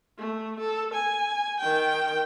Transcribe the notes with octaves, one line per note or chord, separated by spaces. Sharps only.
A3
A4
G#5
D#3 G5